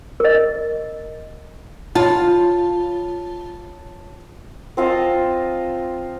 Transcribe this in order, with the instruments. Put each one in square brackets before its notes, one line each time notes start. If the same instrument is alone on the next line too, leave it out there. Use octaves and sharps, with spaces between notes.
[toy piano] A#4 D#5
[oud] F4 [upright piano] C#5 A5 B5
[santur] C4 F4 D#5 A5